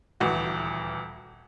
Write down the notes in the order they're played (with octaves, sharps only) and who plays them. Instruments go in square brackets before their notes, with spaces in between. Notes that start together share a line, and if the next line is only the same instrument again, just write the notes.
[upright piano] D#1 D2 E3 F#4